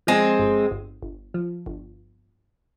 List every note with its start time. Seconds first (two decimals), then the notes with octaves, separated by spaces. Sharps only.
0.07 F3 G#3 C4
0.39 G1
0.71 G1
1.02 G1
1.34 F3
1.66 G1